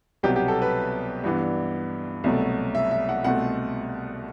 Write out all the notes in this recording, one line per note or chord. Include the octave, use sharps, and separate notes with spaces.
C2 B2 F#3 B3 G4
G4
A4
B4
G2 E3 B3 D4
C2 B2 F#3 A3
E5
E5
F#5
C2 B2 A3 C4 F#5